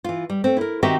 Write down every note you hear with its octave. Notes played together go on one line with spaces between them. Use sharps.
E3 F4
G3
A3 C4
E4 A#4
D#3 C4 F#4 G4 D#5 E5